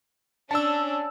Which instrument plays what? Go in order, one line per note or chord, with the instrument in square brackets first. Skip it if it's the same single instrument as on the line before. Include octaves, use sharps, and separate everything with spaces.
[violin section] C#4 D4 [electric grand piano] A5 E6